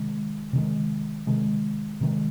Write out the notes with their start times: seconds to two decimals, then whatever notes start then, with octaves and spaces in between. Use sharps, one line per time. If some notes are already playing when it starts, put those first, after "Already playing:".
Already playing: C3 D#3 G#3
0.53 C3 D#3 G#3
1.27 C3 D#3 G#3
2.01 C3 D#3 G#3